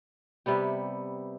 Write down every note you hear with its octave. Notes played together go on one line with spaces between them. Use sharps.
C3 G3 B3 G4